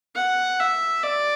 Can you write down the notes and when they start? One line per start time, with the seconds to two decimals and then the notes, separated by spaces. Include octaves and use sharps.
0.15 F#5
0.60 E5
1.03 D5